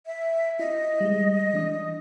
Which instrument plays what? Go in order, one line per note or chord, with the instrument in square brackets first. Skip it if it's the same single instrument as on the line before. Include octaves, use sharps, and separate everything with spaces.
[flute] E5
[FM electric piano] E4 [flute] D#5
[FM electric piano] G3 G#3
E3 D4 D#6